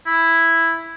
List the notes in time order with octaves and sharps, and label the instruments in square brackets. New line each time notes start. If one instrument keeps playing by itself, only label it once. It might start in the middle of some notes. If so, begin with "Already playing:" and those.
[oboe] E4